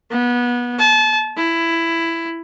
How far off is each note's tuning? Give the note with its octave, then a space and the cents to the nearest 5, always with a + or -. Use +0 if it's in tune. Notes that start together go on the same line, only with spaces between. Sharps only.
B3 -25
A5 -30
E4 +10